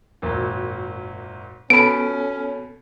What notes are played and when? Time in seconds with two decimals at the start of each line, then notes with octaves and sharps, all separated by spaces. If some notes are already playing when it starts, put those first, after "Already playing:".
0.22 G#1 F#2 A#2
1.70 B2 B3 C#4 A4 G#5 B5 D7